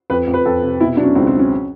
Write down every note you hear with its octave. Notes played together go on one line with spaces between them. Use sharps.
F2 B4
F2
B4
F2 A4
C3
B2 E4
F#3 D4
C#4
C#2 C4
C4
F#3
C#4